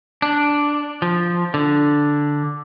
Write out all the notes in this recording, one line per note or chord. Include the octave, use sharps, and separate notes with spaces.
D4
F3
D3